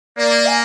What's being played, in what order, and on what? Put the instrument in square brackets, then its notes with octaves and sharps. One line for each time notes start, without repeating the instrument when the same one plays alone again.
[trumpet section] A#3 [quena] D5
[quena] G#5